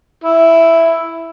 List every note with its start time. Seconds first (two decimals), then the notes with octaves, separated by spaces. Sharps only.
0.24 E4